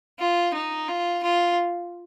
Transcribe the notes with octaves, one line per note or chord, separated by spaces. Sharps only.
F4
D#4
F4
F4